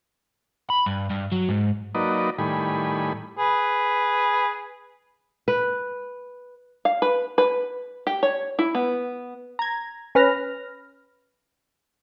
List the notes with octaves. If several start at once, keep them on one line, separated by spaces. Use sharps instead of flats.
B5
G2
G2
F#3
G#2
F#3 A#3 D#4 B4 D5 D#5
A2 D#3 G3 G#5 B5
G#4 B4
B4
F5
B4
B4
G4
C#5
E4
B3
A#5 G#6
C#4 B4 F6 A#6